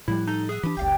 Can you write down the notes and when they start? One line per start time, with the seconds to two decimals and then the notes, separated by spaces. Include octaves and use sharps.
0.08 A2 F3 G3 E4 F#6
0.27 D#4 A4 D#5
0.49 B3 G#4 E5 F#6
0.63 E3 D4 G4 B5 D#6
0.77 F#1 C#2 D5 F5 G5